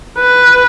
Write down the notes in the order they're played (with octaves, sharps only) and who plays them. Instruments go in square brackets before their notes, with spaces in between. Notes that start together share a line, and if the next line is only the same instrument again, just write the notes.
[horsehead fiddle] B4